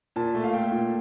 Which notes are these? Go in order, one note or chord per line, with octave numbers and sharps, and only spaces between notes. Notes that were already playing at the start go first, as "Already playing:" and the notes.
A#2 A5
A3
F5
A3 G5
A#2